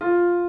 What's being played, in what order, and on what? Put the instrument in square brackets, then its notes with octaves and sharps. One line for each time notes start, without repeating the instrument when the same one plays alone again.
[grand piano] F4